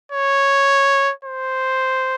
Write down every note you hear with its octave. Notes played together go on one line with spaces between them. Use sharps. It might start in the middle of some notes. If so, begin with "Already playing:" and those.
C#5
C5